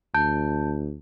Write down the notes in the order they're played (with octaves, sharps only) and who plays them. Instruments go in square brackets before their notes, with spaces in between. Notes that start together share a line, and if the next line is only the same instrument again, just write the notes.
[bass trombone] D2 [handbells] A5 G6